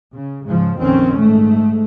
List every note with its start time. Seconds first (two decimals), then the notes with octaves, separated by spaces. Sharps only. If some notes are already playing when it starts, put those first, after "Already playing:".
0.15 C#3
0.46 G#2 C#3 F3
0.79 A#1 F2 D#3 C4 C#4
1.16 G#2 A3